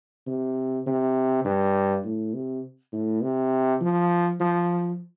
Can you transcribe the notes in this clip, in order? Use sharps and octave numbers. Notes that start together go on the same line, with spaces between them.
C3
C3
G2
A2
C3
A2
C3
F3
F3